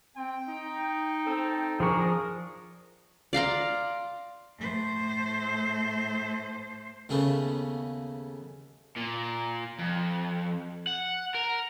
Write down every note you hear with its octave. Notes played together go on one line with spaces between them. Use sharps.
C4 G5
D#4
C4 A4
F3 D4 G#4 A#4 C#6
D5 F5 A#5 C6
A2 C5
D#2 C#3 A3 B3 C#4
A#2
F2
F#5
A#4